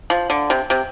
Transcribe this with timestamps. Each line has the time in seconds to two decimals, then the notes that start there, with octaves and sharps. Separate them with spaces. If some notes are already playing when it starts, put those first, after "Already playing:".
0.10 F3
0.30 D3
0.50 C3
0.70 C3